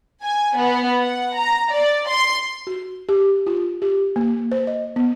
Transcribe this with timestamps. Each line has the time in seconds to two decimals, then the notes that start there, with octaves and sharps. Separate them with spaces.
0.23 G#5
0.56 B3
0.99 F#5
1.35 A#5
1.72 D5
2.09 C6
2.67 F#4
3.09 G4
3.47 F4
3.82 G4
4.16 A#3
4.52 C5
4.67 D#5
4.96 B3